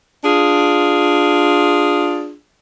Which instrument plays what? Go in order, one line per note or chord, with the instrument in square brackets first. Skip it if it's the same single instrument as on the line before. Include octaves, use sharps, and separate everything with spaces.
[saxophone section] D4 F4 G#4